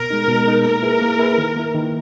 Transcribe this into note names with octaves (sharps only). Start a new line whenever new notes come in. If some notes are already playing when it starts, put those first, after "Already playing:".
Already playing: B2 A#4
G#3 D#4
B2
G#3 D#4
A#3 A#4
E4 G#4 B4
A#3
E4 G#4 B4
D#3
A#3 E4
D#3